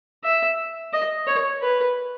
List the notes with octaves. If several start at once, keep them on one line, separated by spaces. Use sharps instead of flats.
E5
D#5
C#5
B4